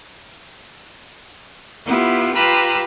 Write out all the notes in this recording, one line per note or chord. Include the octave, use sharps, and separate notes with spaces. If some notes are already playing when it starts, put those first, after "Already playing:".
B3 E4 F4 G4
F4 G4 B4 A#5 B5 E6